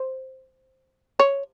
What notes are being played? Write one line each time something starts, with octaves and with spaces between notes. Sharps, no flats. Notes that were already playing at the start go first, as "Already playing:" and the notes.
Already playing: C5
C#5